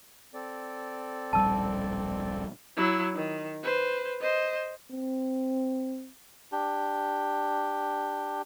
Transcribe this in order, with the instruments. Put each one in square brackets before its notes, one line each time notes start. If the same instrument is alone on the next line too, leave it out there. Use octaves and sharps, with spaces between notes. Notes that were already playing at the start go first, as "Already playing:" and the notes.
[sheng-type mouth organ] C4 A4 D5
[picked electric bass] D1 A#1 G3 [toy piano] A5 E6
[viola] F#3 E4
D#3
B4 C5
C5 D#5
[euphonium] C4
[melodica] D4 G4